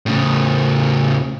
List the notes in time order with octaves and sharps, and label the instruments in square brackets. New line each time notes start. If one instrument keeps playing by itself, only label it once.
[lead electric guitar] A2 C#3